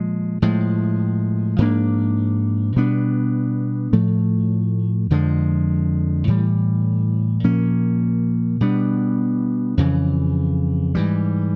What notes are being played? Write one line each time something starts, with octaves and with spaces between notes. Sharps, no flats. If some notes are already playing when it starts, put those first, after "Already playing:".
Already playing: A#2 F3 G#3
A2 F3 G#3
G#2 F3 A#3 D4
B2 G3 B3 D4
A2 F3 A3
F2 D3 F3 G#3
A2 E3 G3
A#2 F3 A#3 C#4
B2 G3 B3 D4
F2 C#3 E3
G#2 E3 G3